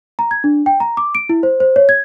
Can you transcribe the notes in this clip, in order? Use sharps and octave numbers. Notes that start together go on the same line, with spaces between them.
A#5
G#6
D4
G5
A#5
D6
D7
E4
C5
C5
C#5
G#6